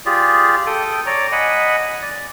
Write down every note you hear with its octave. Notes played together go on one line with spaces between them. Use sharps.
F4 G4 G#4 D5
A4 G5 D#6
C#5 D5 A#5 D6
D#5 F#5 G#5 B5
D5